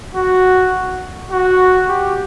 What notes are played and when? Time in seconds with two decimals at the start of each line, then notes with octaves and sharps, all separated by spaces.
0.15 F#4
1.31 F#4
1.89 G4